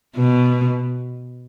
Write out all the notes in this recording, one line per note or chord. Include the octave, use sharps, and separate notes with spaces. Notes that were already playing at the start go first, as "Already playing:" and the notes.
B2